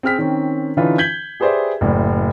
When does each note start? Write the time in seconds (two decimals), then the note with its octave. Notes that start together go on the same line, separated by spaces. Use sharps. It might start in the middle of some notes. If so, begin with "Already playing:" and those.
0.03 C4 G#4 F6 B6
0.18 D#3 C4 C#4
0.77 D3 E3 C#4 D#4 F4 B4
0.98 G6 G#6 B6 F#7 G7
1.40 G4 G#4 B4 C5 D5 E5
1.81 F#1 A2 D5